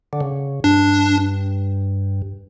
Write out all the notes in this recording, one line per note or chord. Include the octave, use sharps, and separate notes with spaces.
D3
C#3
G2 D4